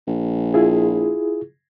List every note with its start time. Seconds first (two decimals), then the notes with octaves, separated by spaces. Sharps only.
0.07 A#1
0.54 E4 F4 G#4